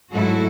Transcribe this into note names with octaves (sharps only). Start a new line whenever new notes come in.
G#2 F#3 A3 E4 F#4 A4